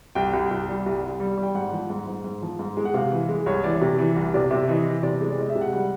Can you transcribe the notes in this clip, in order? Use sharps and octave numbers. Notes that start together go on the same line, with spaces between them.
C2 G5
C2
C2
G3
C2
C2
G3
G3
G5
G#2 F#5
F3
G#2
G#2
G#2
F3
G#2
G#3
F#5
C3 F5
E3
G#3
C2 C#5
E3 D5
C3
E3
C2
C3 D5
C3 E5
E3 D#5
E3
C3 D5
G#3
D5
G#3 D#5
E5
C3
F#5
G3 F#5